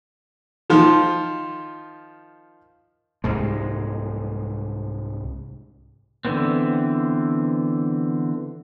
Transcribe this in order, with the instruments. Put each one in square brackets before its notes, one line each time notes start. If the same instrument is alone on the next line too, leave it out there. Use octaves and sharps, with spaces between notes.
[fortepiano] D#3 F3 F4
[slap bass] C2 G#2 G#3
[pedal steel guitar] D3 E3 B3 C4